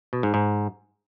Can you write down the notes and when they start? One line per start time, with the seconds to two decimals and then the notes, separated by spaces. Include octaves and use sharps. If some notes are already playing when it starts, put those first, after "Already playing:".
0.13 B2
0.23 G#2
0.34 G#2